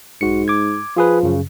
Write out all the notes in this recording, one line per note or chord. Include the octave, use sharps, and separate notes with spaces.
B1 G#2 F#4 C#7
D6 G#6
F3 F4 G#4 B4
F#2 C#3